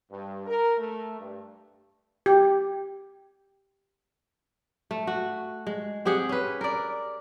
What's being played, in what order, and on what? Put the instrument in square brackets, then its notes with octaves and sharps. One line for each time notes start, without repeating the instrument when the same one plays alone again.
[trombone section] G2
A#4
A3
G2
[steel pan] G4
[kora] A3
F#4
G#3
C4 G4 G#4 F#5
C#4 B4
A#4 D5